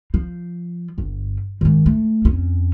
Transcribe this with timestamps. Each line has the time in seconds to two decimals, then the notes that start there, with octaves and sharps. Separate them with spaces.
0.14 F3
0.98 G1
1.61 G#2 D#3
1.86 A3
2.25 F2 C#4